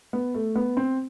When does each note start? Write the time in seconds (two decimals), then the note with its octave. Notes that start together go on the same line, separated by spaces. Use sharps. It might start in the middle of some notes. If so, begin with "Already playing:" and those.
0.13 B3
0.34 A3
0.55 B3
0.77 C4